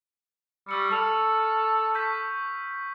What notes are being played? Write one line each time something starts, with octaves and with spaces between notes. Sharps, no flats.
G3 C#6 E6 C#7
A4 E6 F6 F7
C#6 G6 B6